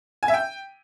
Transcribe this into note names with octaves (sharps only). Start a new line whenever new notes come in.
G#5
E5
G5